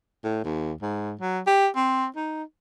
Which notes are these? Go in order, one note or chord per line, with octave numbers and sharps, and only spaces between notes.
A2
D#2
G#2
F#3
G4
C4
D#4